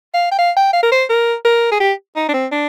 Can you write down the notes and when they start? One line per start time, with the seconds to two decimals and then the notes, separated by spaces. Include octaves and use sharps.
0.14 F5
0.31 G5
0.39 F5
0.57 G5
0.73 F5
0.83 A#4
0.92 C5
1.10 A#4
1.45 A#4
1.72 G#4
1.80 G4
2.16 D#4
2.29 D4
2.34 C4
2.51 D4